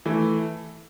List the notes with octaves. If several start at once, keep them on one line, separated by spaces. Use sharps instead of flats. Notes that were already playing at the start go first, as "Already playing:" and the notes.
E3 A3